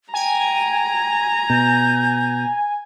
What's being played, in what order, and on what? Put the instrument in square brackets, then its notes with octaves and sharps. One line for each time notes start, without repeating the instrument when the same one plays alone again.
[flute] G5 [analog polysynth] G#5 [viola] A#5
[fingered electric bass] B2 [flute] G6